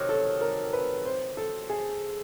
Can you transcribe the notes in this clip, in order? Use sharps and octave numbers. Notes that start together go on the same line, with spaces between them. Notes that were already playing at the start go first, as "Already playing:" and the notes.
Already playing: C3 D#3 F#3
A4
A#4
B4
C5
A4
G#4